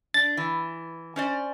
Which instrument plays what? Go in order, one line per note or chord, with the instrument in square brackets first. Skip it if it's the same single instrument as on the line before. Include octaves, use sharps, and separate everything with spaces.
[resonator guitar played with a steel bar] D4 [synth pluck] A6
[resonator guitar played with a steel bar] E3
C#4 C5 D5